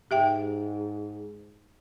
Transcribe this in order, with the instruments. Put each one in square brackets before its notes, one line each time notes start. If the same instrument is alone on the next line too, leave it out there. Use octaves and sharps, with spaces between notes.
[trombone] G#2 [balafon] G4 E5 G5